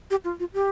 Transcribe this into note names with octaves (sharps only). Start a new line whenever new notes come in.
G4
F4
F4
G4